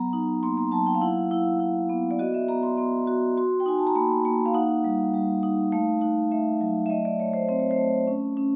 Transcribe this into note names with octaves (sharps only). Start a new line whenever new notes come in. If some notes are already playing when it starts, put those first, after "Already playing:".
Already playing: F#3 B3 A#5
D#4
A#3 C6
A#5
F#3 A5
G5
F5
E4 F#5
E4 F5
E4
B3
D5
F#4 D#5
E5
B3 A#5
C6
B3 C6
F#4
F#4 C6
G5
D#4 G#5
A5
A#5
A#3 B5
A#3
F5
D#4 F#5
G3
G3
D#4
A3 F5
D#4
A3 E5
F#3
E5
A3 D#5
D5
A3 C#5
C5
C4 C5
C#5
C5
A3
C#4
C#4